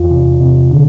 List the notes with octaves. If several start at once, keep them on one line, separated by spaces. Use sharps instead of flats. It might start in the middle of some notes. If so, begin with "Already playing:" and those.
Already playing: E2 F4
C3
C3
D3